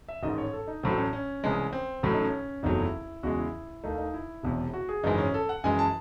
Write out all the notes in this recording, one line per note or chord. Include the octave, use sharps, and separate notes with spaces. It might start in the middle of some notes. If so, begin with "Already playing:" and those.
E5
A1 G#2 D#3 D#5
C#5
A4
D#4
A1 A2 F#3 A3 C4
C#4
C#4
C2 C3 E3 G#3
C4
A1 A2 F#3 A3 C#4
D#4
C#4
F#1 E2 C3 F#3 A3 D#4
E4
E2 C#3 G#3 F#4
E4
D#2 D#3 A3 D#4
D#4
E4
E1 E2 C3
F#4
G#4
G#1 F#2 C#3 E3 G#3 D#4
C#4
A4
F#5
F#2 E3 G#3 G#5
A5